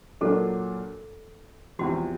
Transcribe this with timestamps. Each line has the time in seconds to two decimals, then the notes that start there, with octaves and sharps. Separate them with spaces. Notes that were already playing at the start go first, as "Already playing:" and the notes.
0.21 A#2 F#3 A#3 D4 A4
1.79 E2 C3 F3 F#4